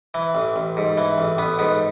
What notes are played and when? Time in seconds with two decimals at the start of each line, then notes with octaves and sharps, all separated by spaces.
0.14 E3
0.35 A1
0.56 A1
0.77 G#2
0.97 E3
1.18 A1
1.38 A1 B3
1.59 G#2 B3